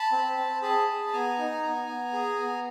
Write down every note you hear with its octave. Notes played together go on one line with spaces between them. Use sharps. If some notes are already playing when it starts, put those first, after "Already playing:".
Already playing: A5 B5
C4
C4
G#4 A5 B5
G#4
B5
B3 G#5 A#5
D#4
B3
B3
G#4
B3